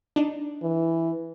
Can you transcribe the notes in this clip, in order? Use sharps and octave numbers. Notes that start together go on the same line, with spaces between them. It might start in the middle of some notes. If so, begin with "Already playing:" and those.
D4 D#4
E3